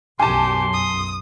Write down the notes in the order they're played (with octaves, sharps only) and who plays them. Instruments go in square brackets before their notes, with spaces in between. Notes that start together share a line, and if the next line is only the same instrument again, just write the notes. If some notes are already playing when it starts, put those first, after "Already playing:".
[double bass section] B1 F#2 [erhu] G4 [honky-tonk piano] G#5 A5 [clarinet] C6
[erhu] D#6